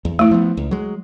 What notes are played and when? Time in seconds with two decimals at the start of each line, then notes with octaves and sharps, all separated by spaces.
0.05 E2
0.19 A3 E4
0.31 F3 B3
0.57 C#2
0.71 F#3 G#3